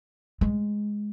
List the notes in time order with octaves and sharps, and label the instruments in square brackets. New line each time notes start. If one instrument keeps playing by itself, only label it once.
[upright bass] G#3